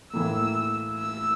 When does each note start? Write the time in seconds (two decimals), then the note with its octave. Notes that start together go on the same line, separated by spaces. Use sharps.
0.13 A2 E3 A#3 E6
0.99 E6